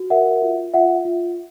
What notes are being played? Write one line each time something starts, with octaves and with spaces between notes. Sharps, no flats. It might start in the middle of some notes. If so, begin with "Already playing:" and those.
Already playing: F#4
A#4 E5 F#5
F4
F4 E5 F#5
F4